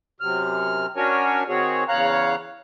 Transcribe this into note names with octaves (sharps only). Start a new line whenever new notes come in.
F#2 C3 F6
C#4 D4 F#4 A#4 C#5 G#5
D#3 C4 F#4 G#4 C#5
E2 C#3 C#5 F5 A#5 F#6